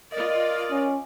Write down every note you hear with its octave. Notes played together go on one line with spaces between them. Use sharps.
F4 A#4 D5 D#5
C#4